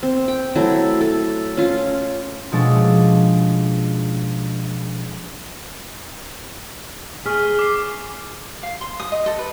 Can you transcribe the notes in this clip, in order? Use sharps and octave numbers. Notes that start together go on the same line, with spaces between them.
C4
G5
F#3 A3 E4 A4
A4
C#4 F4
B2 F3 G#3 C#4 D4 A4
G#4 C#6 F6 B6
D6 C7
F5
C6
D#6
D#5
A4
B4